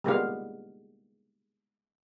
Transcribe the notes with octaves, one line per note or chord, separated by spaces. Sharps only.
G3 G#3 A#3 B3 F4 F5